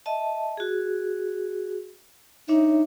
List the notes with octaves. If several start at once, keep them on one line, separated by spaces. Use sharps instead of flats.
D#5 E5 A5
F#4 G#4
D4 D#4 C#5 E5